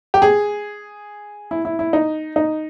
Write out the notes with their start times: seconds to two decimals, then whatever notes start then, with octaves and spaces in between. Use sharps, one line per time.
0.14 G4
0.22 G#4
1.51 E4
1.65 E4
1.79 E4
1.93 D#4
2.36 D#4